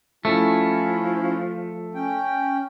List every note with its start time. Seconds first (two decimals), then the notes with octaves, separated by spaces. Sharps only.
0.25 F3 A3 C#4 E4
1.95 C#4 G5